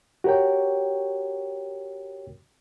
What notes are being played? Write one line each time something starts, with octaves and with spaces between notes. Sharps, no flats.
F#4 G4 A#4 C#5 G5